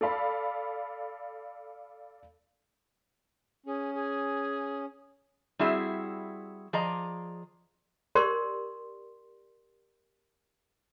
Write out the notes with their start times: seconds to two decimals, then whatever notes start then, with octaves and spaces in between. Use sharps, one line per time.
0.01 A4 D5 F5 B5
3.66 C#4 G#4
3.94 G#4
5.59 G3 C4 E4 F#4 G#4 E5
6.73 F3 G#4 D5 D#5 A#5
8.15 G4 A#4 D5 C6